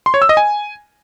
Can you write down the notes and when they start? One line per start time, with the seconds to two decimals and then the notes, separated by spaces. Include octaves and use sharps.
0.06 C6
0.14 C#5
0.22 E6
0.29 D#5
0.37 G#5